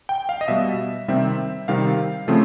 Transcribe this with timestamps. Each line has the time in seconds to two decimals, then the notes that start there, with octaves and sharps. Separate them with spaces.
0.09 G5
0.29 F5
0.41 D#5
0.48 B2 G3 B3 E5
1.08 C3 D#3 G3 C4 E5
1.68 C3 D#3 G3 C4 F5
2.28 C#3 F3 A3 C4